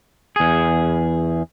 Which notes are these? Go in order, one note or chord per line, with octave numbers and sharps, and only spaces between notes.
E2 G#4